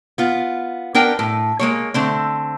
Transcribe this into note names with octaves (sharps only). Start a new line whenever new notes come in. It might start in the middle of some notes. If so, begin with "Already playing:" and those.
B3 F4
B3 D4 A#4 G5
A2
G#3 A#3 C#5
D3 A3 C4